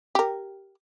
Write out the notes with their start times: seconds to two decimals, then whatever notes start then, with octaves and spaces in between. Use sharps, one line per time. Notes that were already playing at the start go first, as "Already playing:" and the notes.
0.15 G4 A#4